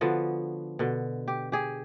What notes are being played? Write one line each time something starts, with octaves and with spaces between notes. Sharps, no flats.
D3 F3 B3 F#4
B2 D3
G4
G4 G#4